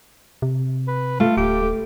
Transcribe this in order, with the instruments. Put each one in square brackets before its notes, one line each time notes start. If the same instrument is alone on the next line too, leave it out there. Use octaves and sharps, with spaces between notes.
[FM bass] C3
[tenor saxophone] B4
[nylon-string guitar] A3 [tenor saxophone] F4
[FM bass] D1 [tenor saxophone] G4